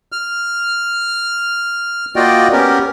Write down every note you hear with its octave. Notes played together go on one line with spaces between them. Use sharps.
F6
A#3 F4 F#4 D5 D#5 G5
B3 C#4 G4 A#4